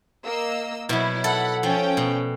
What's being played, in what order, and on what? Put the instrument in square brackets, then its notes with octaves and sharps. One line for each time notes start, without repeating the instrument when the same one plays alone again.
[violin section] A#3 D#5 E6
[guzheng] B2 F#3 [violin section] E4
[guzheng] A4 [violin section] F#5 B5
[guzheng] F3 [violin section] C#4 G5
[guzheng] B2